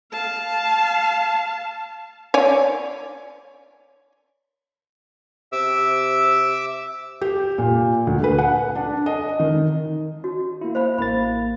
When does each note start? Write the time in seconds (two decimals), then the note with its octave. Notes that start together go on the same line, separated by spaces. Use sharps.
0.13 F5 A5
2.34 C#5 D5 G#5
5.52 C3 E5 D6 E6
7.21 G4
7.58 A#2
8.07 D2
8.24 B4
8.39 F#5
8.75 D4
9.06 D#5
9.40 D#3
10.24 F#4
10.61 A#3 E4
10.75 C5 F5 B5
10.98 A1 A#3 B5 A6